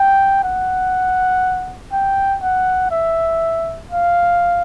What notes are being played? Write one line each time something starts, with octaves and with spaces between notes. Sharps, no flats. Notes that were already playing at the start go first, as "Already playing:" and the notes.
Already playing: G5
F#5
G5
F#5
E5
F5